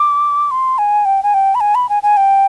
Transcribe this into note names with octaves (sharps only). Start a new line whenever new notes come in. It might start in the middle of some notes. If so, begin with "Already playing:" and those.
Already playing: D6
C6
G#5
G5
G#5
G5
B5
G#5
B5
G#5
G#5
G5